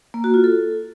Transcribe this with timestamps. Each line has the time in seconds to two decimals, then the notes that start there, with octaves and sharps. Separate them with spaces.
0.14 A#3
0.24 F#4
0.34 F4
0.44 A4